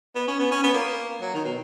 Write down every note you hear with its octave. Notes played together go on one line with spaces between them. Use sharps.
B3
C#4
B3
C#4
B3
A#3
F#3
D#3
B2